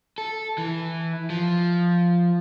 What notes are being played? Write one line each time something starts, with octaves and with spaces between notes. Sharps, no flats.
A4
E3
F3